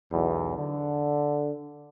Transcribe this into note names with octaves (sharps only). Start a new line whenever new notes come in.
B1 E2
D3